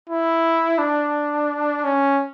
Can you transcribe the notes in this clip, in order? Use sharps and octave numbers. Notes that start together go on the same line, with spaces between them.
E4
D4
C#4